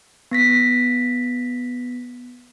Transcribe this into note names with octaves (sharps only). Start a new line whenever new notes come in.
B3 A#6 B6